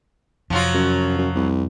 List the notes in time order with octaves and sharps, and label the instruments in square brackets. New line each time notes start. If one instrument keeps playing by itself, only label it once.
[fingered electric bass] F2 C3 [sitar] F3 F#3 F4
[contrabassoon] F#2
F#2
C2